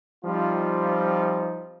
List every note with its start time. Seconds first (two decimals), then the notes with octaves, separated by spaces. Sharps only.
0.24 F3 G3 C4 D#4 F4